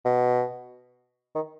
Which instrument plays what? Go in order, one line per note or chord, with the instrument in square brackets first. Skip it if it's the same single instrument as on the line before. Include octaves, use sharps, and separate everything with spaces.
[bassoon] B2
D#3